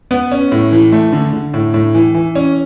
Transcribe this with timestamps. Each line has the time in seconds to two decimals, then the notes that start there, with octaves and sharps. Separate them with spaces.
0.11 B3
0.32 C#4
0.52 A2
0.72 E3
0.92 A3
1.12 D3
1.33 D3
1.54 A2
1.74 A2
1.95 E3
2.15 E3
2.35 C#4